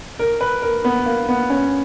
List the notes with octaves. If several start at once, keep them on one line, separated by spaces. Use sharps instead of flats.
A#4
B4
A#4
B3
A#3
B3
C#4